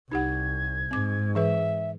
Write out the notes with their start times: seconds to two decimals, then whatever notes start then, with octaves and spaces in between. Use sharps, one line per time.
0.11 C2 D#4 G4 F#5 G#6
0.91 G#2 C4 D6
1.35 E3 G#4 B4 E5